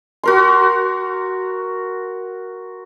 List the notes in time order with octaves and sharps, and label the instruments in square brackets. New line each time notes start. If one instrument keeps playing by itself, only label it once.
[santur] F#4 A#4 C6